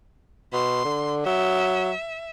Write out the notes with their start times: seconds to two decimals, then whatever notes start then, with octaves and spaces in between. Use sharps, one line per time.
0.53 B2 C6
0.85 D3
1.26 F#3 E5